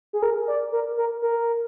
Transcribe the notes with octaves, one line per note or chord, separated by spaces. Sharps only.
G#4
A#4
D5
A#4
A#4
A#4